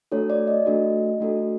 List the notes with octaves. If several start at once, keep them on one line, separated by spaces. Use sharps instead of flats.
A3 D4 F#4 A4 C#5
D5
D#5
A3 D4 F#4 A4
A3 D4 F#4 A4